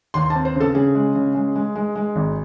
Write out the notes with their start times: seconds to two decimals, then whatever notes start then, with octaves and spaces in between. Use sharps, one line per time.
0.14 D#2 C6
0.30 A5
0.35 C4
0.45 C5
0.55 C#3
0.60 A4
0.75 C#3 G#4
0.95 G#3
1.15 C#3
1.35 G#3
1.55 G#3
1.75 G#3
1.95 G#3
2.16 G#1